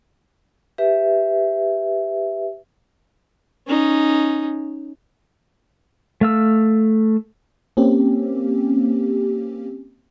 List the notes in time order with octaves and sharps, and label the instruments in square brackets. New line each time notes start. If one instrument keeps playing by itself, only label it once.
[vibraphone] G4 B4 E5
[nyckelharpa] C#4 D#4
[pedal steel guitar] A3 F5 E6
[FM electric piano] A#3 C4 C#4 G4